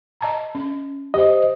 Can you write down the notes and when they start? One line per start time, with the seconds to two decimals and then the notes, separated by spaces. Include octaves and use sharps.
0.21 D#5 A5 A#5
0.55 C#4
1.14 G4 C5 D#5